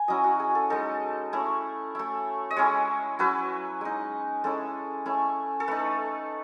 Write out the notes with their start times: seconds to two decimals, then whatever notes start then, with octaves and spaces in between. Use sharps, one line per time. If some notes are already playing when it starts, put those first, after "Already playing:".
Already playing: G#5
0.08 F#3 C#4 E4 D#5
0.24 F#4
0.40 G#4
0.55 A4
0.70 G#3 D#4 A4
1.33 A3 C#4 E4
1.95 A3 E4
2.50 D#5
2.56 G#3 C#4 E4 C#5
3.19 F#3 C#4 E4 B4
3.81 G#3 D#4
4.44 G#3 C#4 E4 A4
5.06 A3 C#4 E4
5.60 A4
5.68 A3 D#4 B4